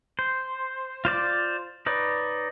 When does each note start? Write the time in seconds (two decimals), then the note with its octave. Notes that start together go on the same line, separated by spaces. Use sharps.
0.19 C5
1.05 F4 C5 D5 D6
1.86 D#4 B4 C#5 D5